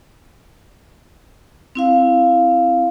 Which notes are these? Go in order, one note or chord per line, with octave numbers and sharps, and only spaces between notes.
C4 E4 F5